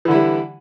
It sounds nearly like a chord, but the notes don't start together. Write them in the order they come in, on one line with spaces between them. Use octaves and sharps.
E3 D3 E4 G3